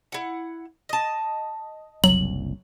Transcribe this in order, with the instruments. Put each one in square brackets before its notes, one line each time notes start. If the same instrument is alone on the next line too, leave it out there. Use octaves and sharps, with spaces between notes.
[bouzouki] E4 F#5
D#5 A5
[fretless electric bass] F#1 C2 [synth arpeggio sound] F#3 [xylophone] F#7